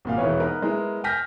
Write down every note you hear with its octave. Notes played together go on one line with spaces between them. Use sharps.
G#1 A#2 F5
E1 E3 B4 C#5
B3 D#4 A#4 B4
G#3 B3 E4 A#4
G5 G#5 F6 G6 A#6 B6